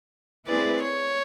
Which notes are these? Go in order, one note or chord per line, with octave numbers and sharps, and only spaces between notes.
A3 C4 E4 G#4 B4 D5
C#5